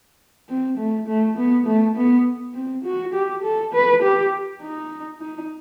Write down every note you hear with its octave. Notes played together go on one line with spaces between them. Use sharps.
C4
A3
A3
B3
A3
B3
C4
F#4
G4
A4
B4
G4
D#4
D#4